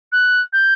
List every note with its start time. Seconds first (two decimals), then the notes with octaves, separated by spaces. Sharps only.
0.12 F#6
0.52 G6